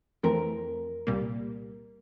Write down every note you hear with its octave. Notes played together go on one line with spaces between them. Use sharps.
F2 E3 A3 C4 A#4
C2 A#2 G3 A#3